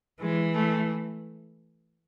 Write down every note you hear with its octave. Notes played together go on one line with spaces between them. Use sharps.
E3 G#3
A3